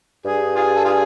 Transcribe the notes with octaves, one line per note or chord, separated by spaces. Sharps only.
G2 G#4
F4 G#4
A4
F4 G#4